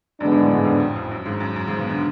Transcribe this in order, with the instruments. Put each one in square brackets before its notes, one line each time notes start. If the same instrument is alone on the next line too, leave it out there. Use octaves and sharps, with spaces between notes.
[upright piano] F#2 [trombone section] D3 G#3 B3 D4
[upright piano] G#1 G#2
A1 A2
G#1 G#2
F2
F2
F2
F#2
G#1 G#2
F#2
F#2
G#1 G#2
B1 B2
D3